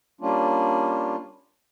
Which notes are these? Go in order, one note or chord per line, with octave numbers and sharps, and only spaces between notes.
G3 A#3 C#4 D4 F4